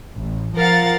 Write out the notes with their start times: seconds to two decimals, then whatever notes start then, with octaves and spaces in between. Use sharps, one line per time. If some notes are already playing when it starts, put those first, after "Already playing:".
0.17 A1
0.57 F3 A#4 F5 F#5 A6